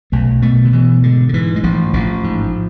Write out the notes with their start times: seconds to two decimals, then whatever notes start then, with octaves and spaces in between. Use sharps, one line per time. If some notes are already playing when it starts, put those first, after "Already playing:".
0.12 B1 A3
0.42 B2 A3
0.65 D3
0.73 B2 E3
1.03 G#2 D3
1.29 D3
1.33 G#2 E3
1.56 G#3
1.63 A1 F3
1.93 A1 F3
2.24 G#2